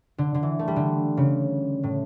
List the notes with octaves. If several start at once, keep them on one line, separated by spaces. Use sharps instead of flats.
D3
D3
E3
A3
G3
D3
C#3
A2